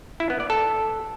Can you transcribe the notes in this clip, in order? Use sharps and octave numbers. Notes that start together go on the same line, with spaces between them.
E4
B3
D5
A4